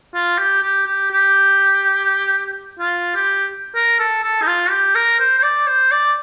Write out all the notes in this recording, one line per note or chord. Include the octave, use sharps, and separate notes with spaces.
F4
G4
G4
G4
G4
F4
G4
A#4
A4
A4
D#4
F4
G4
A#4
C5
C5
D5
C5
D5